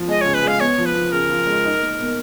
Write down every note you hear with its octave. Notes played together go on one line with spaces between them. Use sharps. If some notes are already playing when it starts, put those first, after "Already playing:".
Already playing: F3
G#3 D#5
C#3 C#5
B4
G#3
F5
B3 C#5
F3
B4
F3
C#3 A#4
F3
G#3
D#4
A#3
B2